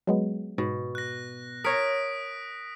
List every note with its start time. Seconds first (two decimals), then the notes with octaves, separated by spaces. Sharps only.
0.07 F#3 G#3 B3
0.58 G#2 B2
0.95 F#6 A#6
1.64 A#4 C#5 D#6 B6 D7